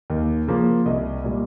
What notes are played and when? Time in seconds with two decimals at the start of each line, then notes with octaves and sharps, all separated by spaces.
0.10 D#2
0.48 C#3 F3 A#3
0.86 C2 D#5
1.24 A#2 G3